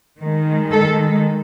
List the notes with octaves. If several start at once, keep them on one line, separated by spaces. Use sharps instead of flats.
D#3 G#3
A4